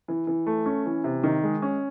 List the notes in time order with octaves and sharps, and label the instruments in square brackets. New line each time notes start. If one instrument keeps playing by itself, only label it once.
[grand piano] E3
E3
A3
C#4
E3
C3
D#3
G#3
C#4